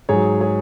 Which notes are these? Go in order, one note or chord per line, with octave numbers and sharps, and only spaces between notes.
G#2 F#3 G#4 C#5
G#4 C#5